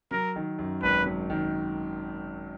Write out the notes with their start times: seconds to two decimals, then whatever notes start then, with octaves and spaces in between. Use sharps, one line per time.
0.11 F#3 A#4
0.36 D#3
0.59 F#2
0.83 G#1 B4
1.06 F#3
1.30 D#3